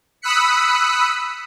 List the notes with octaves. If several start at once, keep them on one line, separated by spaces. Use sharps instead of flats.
B5 D#6 E6 F#6 B6 C#7